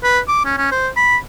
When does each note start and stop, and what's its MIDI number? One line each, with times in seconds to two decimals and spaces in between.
0.04 0.19 71
0.28 0.41 86
0.45 0.54 61
0.58 0.71 61
0.72 0.88 72
0.97 1.17 83